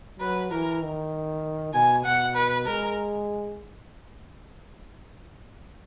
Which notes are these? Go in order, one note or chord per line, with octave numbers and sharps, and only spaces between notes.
F#3 B4
E3 A#4
D#3
B2 G#5
B2 F#5
B4
G#3 A#4